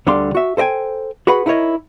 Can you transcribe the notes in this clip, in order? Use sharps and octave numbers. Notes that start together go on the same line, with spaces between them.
D2 D3 G3 G4 F5 C6
F#4 E5
A4 C5 D#5 G5 G#5
F#4 G#4 B4 F#5 B5
D#4 E4 A#4 C#5 D#5